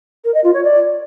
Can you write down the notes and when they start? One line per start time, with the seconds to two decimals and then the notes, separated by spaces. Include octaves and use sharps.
0.24 A#4
0.34 D#5
0.44 F4
0.54 C#5
0.63 D5